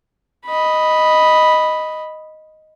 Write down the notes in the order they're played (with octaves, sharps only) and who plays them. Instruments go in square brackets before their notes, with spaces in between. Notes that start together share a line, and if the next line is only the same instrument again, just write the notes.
[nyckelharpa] D#5 B5